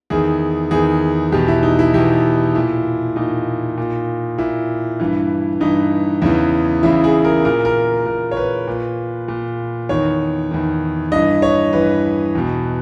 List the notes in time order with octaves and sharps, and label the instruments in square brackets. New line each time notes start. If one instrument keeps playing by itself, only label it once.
[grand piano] E2 D#3 G#4
E2 D#3 G#4
E2 B2 G4
E4
D#4
E4
E2 B2 G4
A#2 E4
A#2 D#4
A#2
A#2 E4
G2 E3
G2 E3 D#4
E2 C#3 E3
E2 C#3 E3 E4
G#4
A#4
A#2 A#4
A#4
A#2 A#4
C#5
B4
A#2
A#2
E2 D#3 C#5
E2 D#3
G2 E3 D#5
C#5
G2 E3 B4
E2 B2